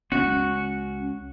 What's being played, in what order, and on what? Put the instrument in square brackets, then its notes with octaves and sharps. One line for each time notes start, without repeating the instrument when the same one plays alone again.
[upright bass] C#2 [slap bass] C4 C#4 [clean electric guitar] F#4